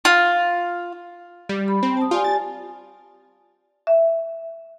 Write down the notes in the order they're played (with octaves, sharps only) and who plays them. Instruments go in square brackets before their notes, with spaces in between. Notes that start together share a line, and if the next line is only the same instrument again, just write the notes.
[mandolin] F4
[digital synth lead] G3
[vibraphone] B5
[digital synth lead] C4
[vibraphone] A5 D#6
[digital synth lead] F4 [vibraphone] G4 D5 G#5
[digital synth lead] A6
[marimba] E5